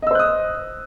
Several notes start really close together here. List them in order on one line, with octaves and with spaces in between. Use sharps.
D#5 E6 C5 F#6 D#6